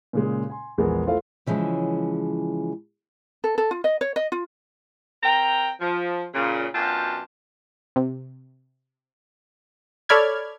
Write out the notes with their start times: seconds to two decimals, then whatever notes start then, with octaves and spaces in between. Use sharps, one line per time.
0.13 A#2 C#3 G#3
0.50 G#5 C6
0.78 A#1 E2 G#3 B3 G#4 A#4
1.06 A3 E4 F4 A4 C5 F5
1.46 C#3 E3 F3 G#3 C#4
3.44 A4
3.58 A4
3.71 F4
3.84 D#5
4.01 C#5
4.16 D#5
4.32 F4
5.23 C4 A#4 G5 A#5
5.80 F3
6.34 A#2 C#3
6.75 F#2 B2 D4 F4 G5 A5
7.96 C3
10.09 A4 C#5 D5 B5 F6 G#6